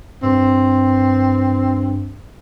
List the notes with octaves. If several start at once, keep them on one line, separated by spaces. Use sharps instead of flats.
G2 C4